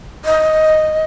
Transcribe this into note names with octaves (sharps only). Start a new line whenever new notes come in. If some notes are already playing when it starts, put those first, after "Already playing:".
D#5